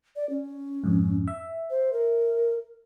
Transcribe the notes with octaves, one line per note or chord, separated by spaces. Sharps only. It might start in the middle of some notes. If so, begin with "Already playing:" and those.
D5
C#4
F2 G#2
E5
C5
A#4